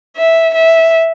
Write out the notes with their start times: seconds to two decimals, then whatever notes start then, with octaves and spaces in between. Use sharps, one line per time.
0.16 E5
0.55 E5